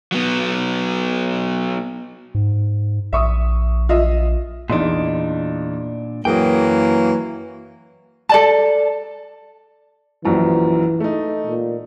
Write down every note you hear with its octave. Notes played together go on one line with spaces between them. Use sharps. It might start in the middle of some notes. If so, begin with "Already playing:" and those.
F#3 B3
G#2
A#1 E5 C#6 D#6
F4 D#5 E5
E2 A#2 D4 D#4 C6
F#2 E3 F#3 A#3 G#4 G5 D#6
A4 D5 A5
A#1 F#2 E3 F3
A3 D#4
A#2